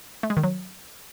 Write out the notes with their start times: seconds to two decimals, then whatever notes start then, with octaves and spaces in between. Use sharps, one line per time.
0.23 A3
0.30 G#3
0.37 D#3
0.44 F#3